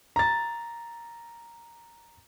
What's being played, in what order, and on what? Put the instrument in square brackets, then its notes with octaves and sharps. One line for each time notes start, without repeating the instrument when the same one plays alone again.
[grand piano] A#5 A6